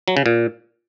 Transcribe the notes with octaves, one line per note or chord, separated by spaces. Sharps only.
F#3
C#3
A#2